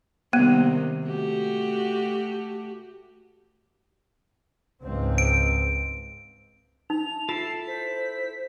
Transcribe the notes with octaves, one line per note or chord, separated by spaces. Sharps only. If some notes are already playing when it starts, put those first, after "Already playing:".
C3 D#3 G3 A#3 B3
A3 F#4 G4
C#2 G#2 C4
D7
D#4 F7
E4 F4 A4 A5 C7
C5 B6